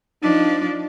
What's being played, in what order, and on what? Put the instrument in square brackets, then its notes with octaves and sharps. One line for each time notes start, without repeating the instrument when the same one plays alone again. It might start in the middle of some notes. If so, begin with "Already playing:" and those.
[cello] F3 D4 [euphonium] D#4